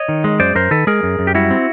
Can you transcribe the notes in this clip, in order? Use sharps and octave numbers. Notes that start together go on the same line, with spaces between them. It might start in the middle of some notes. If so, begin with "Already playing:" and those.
Already playing: C#5 D#5
D#3
G#3
F#2 C5 D5
F#2 A#4 C5
D#3 A4 B4
G#3 G#4 A#4
F#2
F#2
G4
G3 E4 F#4
C4